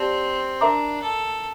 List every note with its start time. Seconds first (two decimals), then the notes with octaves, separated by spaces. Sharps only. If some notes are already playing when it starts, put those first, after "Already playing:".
Already playing: C4 G4 D5 A5
0.61 D4 A#4 E5 A#5 D6
1.02 A4